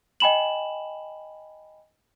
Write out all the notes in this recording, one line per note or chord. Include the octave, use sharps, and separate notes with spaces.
D#5 G5 G#5 B5 E7 F#7